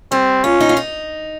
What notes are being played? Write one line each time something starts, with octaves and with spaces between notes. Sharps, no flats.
G3 C4
C#4 F4
D#4
F4
D#4